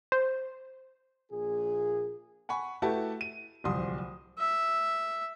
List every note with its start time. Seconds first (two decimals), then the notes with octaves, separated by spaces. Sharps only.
0.12 C5
1.32 A#1 A#2 G#4
2.49 F#5 G#5 B5 C#6
2.82 A3 E4 F#4 G4 B4 A5
3.21 D#7
3.64 D1 C2 F3 C6 D#6
4.39 E5